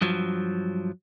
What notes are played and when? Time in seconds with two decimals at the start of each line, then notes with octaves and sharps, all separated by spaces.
0.01 G2 F3 F#3